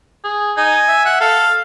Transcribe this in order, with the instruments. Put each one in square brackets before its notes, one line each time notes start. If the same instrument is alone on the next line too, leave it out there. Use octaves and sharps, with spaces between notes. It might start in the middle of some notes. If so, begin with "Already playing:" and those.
[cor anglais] G#4
[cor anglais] D#4 [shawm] G#5
[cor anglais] E5
[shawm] F#5
[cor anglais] A4 [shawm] F5